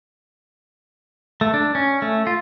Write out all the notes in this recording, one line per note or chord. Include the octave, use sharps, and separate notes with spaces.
A3
D4
C#4
A3
F4